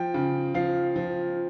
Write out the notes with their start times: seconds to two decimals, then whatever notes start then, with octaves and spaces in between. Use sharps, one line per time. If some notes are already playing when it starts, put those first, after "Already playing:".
Already playing: F3 G5
0.14 C#3
0.54 F3 F5
0.96 F3